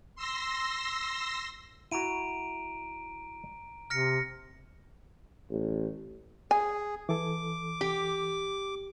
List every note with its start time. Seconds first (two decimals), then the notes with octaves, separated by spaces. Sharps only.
0.16 C6 E6 A#6
1.91 E4 F#4 A#5 D7 D#7
3.90 C3 F6 A#6 C#7
5.50 A1
6.51 G#4 G#5
7.09 E3 A4 D6
7.81 G4